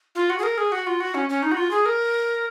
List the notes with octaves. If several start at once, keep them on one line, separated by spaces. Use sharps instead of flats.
F4
F#4
G#4
A#4
G#4
F#4
F4
F#4
C#4
C#4
D#4
F#4
F4
G#4
A#4